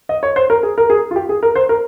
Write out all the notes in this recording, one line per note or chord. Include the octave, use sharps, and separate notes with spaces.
D#5
C#5
C5
A#4
G#4
A#4
G#4
F4
G4
G#4
A#4
C5
A#4